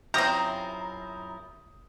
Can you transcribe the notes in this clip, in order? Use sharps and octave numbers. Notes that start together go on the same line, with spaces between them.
F#2 C3 C4 E4 F4 A#5 D#6 G6